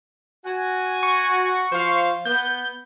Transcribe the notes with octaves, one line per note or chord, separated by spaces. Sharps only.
F#4 G#5
C#6
F3 C5 F5
B3 G6